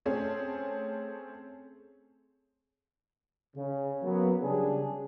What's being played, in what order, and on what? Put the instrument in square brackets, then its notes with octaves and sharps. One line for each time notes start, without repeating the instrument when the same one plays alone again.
[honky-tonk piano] A3 C4 C#4 G#4
[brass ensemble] C#3
F#3 A#3 B3
C#3 G3 D4 G#4